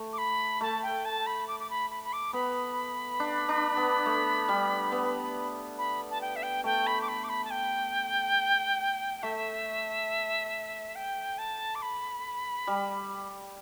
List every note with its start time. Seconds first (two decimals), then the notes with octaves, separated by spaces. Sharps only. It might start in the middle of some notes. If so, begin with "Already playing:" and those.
Already playing: A3
0.12 D6
0.17 B5
0.61 A3 A5
0.82 G5
1.04 A5
1.26 B5
1.47 D6
1.59 D6
1.69 B5
1.90 B5
2.03 B5
2.12 D6
2.33 B3 B5
3.20 D4
3.49 D4
3.77 B3
4.06 A3
4.48 G3
4.92 B3
5.78 B5
6.10 A5
6.20 G5
6.35 E5
6.42 G5
6.64 A3 G5
6.86 B5
7.01 D6
7.08 B5
7.23 D6
7.28 B5
7.44 A5
7.50 G5
9.22 A3 E5
10.95 G5
11.38 A5
11.74 D6
11.81 B5
12.67 G3